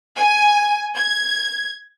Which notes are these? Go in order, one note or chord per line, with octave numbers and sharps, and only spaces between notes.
G#5
G#6